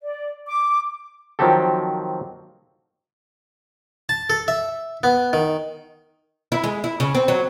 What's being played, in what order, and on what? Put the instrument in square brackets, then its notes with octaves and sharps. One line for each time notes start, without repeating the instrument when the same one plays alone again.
[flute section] D5
D6
[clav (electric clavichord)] D#3 F3 F#3 C4 G4 A4
[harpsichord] A5
A4
E5
B3
D#3
[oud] E4
G#3
E4
C#3
C4
F#3